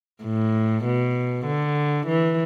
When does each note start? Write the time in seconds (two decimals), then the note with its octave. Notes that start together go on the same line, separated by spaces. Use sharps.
0.23 A2
0.85 B2
1.46 D3
2.07 E3